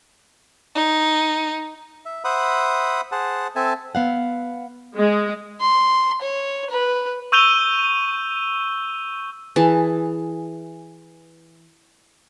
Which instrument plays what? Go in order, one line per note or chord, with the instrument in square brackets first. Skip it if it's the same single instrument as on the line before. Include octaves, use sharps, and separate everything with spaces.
[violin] D#4
[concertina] E5
C5 E5 F#5 B5 D#6
G#4 C5 F#5 A5
C4 A4 E5 G#5 A5
[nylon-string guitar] B3 F5 F#5
[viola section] G#3
[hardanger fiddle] C6
C#5
B4
[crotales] C#6 E6 G6 D#7 F7 G7
[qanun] E3 G#4 A5